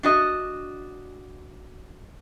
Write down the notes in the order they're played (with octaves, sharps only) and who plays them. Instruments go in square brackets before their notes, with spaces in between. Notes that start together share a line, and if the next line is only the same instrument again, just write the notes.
[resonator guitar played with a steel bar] D4 F#4 D#5